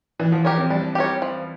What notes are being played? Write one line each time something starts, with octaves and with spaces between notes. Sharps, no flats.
E3 D4
F3
G4 A#4 C#5
C4
G3 D4
G4 A#4 C#5
F3